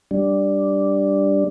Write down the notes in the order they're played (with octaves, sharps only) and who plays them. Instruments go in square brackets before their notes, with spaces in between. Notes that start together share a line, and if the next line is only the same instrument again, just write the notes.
[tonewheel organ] G3 D4